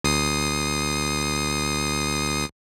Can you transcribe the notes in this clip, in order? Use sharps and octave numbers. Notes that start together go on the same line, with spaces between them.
D2 D#6 C7